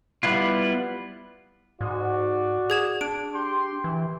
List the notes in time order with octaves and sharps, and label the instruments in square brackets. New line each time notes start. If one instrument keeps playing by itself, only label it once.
[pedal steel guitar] G3 B3 E4 F4
[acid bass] G#2 [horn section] F#4 D5
[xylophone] G#4 G#6 E7
[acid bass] D4 [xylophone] D7
[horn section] G4 C6
[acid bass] E3